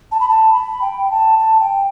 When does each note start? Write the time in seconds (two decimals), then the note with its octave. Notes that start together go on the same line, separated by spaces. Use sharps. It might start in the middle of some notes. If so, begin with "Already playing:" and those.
0.12 A5
0.20 B5
0.29 A5
0.53 B5
0.82 G5
1.11 A5
1.39 A5
1.60 G5